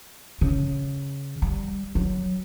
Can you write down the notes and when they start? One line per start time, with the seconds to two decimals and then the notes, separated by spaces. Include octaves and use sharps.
0.41 C#3
1.42 G3
1.95 F#3